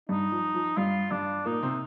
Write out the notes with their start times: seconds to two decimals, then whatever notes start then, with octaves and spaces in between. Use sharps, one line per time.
0.09 G2 G3 D#4
0.32 F3
0.55 F3
0.77 G2 G3 F4
1.11 G2 G3 D4
1.46 A#2 A#3 D#4
1.63 C3 C4